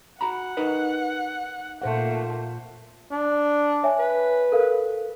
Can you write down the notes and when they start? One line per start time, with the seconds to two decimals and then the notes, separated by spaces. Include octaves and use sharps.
0.21 F#4 F#5 A#5 B5
0.57 D#4 A#4 B4
1.82 A#2 A3 A#3 C5 F#5
3.11 D4
3.83 C#5 E5 G#5
3.99 B4
4.52 A4 A#4 F5